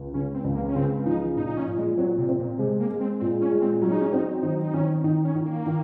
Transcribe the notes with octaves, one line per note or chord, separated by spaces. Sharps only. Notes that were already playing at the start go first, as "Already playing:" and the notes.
Already playing: C#2
C#3 C#4
C4
C#2
A#3
C#4
C#3 C4
F3 D#4
A#2 D#4
D#4
C#4
A#2
G#3
F#3 C4
C3
C4
A#2
C3 G#3
A#3
G#3
C4
A#2 C4
C#4
G#3
C4
F#3 C#4
D#4
C#4
C4 D#4
D#3 D#4
D#4
D#3 C#4
D#3 D#4
C#4
D#3
A#3
D#3